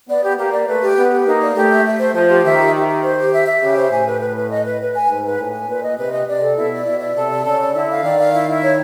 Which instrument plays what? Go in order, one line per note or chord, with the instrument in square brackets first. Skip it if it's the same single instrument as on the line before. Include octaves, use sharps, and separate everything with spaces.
[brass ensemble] B3 [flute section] D5
[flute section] G4
[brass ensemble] A#3 [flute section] G4
[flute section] D5
[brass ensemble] A3 [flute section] B4
[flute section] G4
[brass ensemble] B3 [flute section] B4
[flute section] G4
[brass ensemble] A#3 [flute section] D#4
[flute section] D5
[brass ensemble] A3 [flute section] G4
[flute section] E5
E5
C5
[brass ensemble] F3 [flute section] C5
[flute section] G4
[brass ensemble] D#3 [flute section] E5
[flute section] G4
G4
G4
C5
G4
E5
E5
[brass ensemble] C#3 [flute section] G4
[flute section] C5
[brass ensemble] A2 [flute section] G#5
[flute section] B4
B4
B4
D#5
B4
B4
G#5
[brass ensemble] G#2 [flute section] B4
[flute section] B4
[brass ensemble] A2 [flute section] G#5
[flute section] G#5
[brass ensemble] A#2 [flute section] B4
[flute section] D#5
[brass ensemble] C3 [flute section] B4
[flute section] D#5
[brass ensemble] C3 [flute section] D5
[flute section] A4
[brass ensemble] B2 [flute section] E4
[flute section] D5
[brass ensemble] B2 [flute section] E4
[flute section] D5
[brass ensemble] C3 [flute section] A4
[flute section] D5
[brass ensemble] C#3 [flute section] A4
[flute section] D5
[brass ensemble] D3 [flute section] E4
[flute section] F5
[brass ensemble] D#3 [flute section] D5
[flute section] F5
E4
E4
C#5